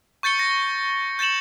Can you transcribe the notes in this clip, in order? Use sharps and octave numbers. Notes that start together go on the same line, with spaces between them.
C#6 G6 A6 C#7 G7
A#6
G6 A6 C#7 E7 F#7